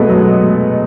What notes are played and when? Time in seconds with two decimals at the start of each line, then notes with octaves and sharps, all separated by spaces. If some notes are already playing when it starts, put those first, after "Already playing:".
Already playing: B2 G#3 A3 B3
0.09 F#3